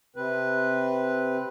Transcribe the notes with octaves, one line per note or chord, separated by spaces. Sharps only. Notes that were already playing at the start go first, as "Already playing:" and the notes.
C3 C4 B4